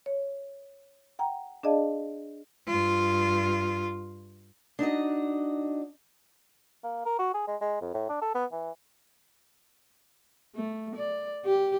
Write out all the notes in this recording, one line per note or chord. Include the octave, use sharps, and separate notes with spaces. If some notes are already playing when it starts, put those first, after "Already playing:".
C#5
F#5 G5 A#5
D4 G#4 D5 D#5 F5 A5
G2 F4
D4 D#4 F#4 D#5
A#3
A#4
F#4
G#4
G#3
G#3
F2
A2
D4
A4
B3
E3
A3
D5
G4